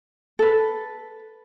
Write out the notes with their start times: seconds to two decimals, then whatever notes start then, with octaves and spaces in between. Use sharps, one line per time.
0.39 A4 B4